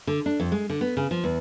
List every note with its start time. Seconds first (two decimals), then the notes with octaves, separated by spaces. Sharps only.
0.07 D3
0.26 D4
0.40 F2
0.52 G#3
0.70 D3
0.81 B3
0.97 C#3
1.11 F3
1.24 E2